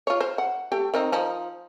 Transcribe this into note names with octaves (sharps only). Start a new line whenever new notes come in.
F4 C#5
C5
F#5
A3 G4 G5
D#3 C4 D#4
F3 D#4